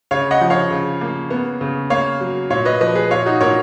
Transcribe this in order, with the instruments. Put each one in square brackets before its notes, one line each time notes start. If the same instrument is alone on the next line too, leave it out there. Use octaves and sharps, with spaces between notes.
[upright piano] C#3 C#5 F5
D#5 F#5
F3
C#5 F5
C#3
A#3
B3
C#3
A#3 C#5 F5
F#3
A#2 C#5 F5
B4 D#5
F3 B4 D#5
G#4 B4
A#2 C#5 F5
D#4 F#4
A#2 A#4 C#5